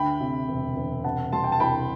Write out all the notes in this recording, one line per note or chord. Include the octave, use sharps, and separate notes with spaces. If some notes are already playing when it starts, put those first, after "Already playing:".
Already playing: D2 G5 B5
C3
E1
E1
C3 F#5 A5
G3 A5 C6
G5
A5
C2 G5 B5